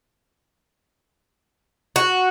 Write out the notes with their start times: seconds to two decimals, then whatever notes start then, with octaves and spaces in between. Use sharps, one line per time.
1.96 F#4